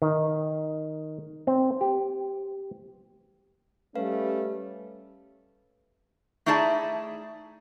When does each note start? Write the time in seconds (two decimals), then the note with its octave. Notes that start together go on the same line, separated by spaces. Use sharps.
0.02 D#3
1.47 C4
1.81 G4
3.95 G3 A3 C#4 B4 F5
6.46 A3 D#4 E4 G#4 D5 A5